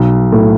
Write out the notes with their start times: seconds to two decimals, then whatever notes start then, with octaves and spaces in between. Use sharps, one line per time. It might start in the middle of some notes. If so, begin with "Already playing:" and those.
Already playing: B1
0.32 A2